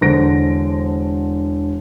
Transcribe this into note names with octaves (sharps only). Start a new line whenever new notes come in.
E1 D3 C5 A#6 D7